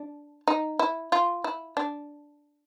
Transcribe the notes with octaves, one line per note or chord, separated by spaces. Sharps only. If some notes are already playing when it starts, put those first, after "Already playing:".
Already playing: D4
D#4
E4
F4
E4
D4